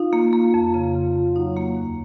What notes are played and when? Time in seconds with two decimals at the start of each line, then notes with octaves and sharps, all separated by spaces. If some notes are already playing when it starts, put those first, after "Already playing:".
Already playing: D#4 F4
0.13 A#3
0.33 A#3
0.54 F2 F4
0.74 C#3
0.95 C#3
1.15 F2
1.36 F#3 D#4
1.57 A#3
1.77 D#2